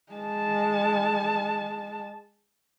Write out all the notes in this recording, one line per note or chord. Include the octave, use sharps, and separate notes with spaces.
G#3 A5